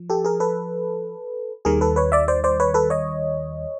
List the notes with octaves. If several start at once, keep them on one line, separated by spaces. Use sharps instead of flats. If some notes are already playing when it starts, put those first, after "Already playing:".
Already playing: F3
G4 A4
G#4 A#4
A4 B4
D#2 D#3 G3 G#4 A#4
A4 B4
B4 C#5
D5 E5
C5 D5
C5 D5
B4 C#5
A4 B4
C#5 D#5